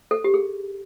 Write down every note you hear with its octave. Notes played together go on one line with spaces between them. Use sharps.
A4
G4
G#4